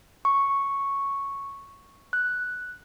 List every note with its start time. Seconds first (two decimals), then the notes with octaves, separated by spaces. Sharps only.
0.25 C#6
2.13 F#6